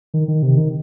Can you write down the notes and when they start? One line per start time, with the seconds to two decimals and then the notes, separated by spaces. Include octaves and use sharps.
0.14 D#3
0.28 D#3
0.43 C3
0.58 D#3